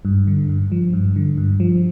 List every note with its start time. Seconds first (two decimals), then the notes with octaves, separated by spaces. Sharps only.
0.05 G2
0.27 D3
0.49 G2
0.72 F3
0.93 G2
1.16 D3
1.38 G2
1.60 F3